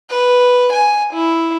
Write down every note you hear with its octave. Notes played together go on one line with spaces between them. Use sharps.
B4
G#5
E4